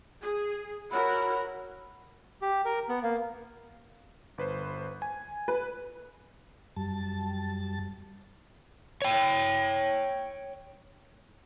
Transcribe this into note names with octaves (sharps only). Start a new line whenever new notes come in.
G#4
E4 F#4 A#4 C#5 F#5 B5
G4
A#4
B3
A#3
G1 B4 C5
G#5
B4
F#2 G3 A5
C#5 G5